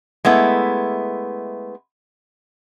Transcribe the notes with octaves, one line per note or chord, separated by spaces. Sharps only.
G#3 A3 B3 E4